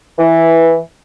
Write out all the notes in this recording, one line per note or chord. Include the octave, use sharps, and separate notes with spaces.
E3